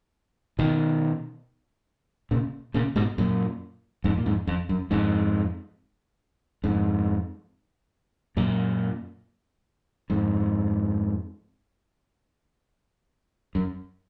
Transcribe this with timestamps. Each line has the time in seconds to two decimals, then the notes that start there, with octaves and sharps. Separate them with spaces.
0.59 B2 D#3
2.31 A#2 C#3
2.74 A#2 C#3
2.96 G#2 B2
3.18 F#2 A#2
4.04 F2 G#2
4.17 A#2
4.26 F2 G#2
4.47 F2
4.69 F#2
4.91 F2 G#2
6.64 F2 G#2
8.37 F#2 A#2
10.10 F2 G#2
13.55 F#2